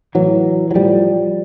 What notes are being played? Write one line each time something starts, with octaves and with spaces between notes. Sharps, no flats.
A2 E3 F#3
F#3
A2 F3 G3